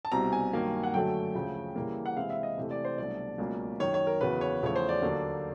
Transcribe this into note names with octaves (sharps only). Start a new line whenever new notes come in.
A5
C2 B2 G3 C4 A#5
G#5
G2 D#3 F#3 A#3
F#5
F#2 D3 F#3 A3 G5
D2 C#3 F3
C#3 E3 G3 A#3
F#5
C3 E3 G#3 C4 E4 F5
E5
D#5
C3 E3 A3
D5
C5
C2 B2 F#3 A3 D4 D5
C#2 B2 F#3 A#3 C#4
F#2 D#3 F#3 C#5
C#5
A#4
E2 C#3 F#3 B4
C#5
E2 C#3 F3 A3 C#5
C5
D5
D#2 D3 F#3 A#3